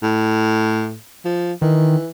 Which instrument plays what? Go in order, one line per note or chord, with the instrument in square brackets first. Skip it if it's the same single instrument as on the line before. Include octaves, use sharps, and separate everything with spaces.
[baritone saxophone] A2
F3
[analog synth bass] D#3 [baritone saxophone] E3